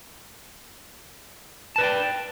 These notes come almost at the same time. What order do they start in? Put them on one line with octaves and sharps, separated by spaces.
A5 B4 D5 G5